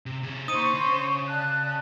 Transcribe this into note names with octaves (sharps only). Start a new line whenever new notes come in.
C3
C3 G#4
A#3 D#4 C5 C#6 D#6 D#7
C#3 B5
D5 A5 F#6